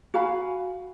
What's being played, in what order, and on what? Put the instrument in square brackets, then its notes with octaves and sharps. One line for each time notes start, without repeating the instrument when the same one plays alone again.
[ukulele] F#4 F5 G#5 B5